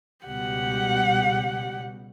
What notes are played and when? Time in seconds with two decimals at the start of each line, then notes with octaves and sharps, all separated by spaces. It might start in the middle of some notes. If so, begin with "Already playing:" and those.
0.25 C#2 B2 G3 G4 F#5